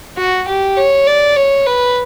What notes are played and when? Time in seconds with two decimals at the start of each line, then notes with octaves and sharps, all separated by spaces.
0.17 F#4
0.48 G4
0.77 C#5
1.07 D5
1.36 C#5
1.66 B4